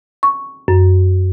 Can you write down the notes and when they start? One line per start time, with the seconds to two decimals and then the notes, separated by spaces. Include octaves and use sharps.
0.23 C#6
0.68 F#2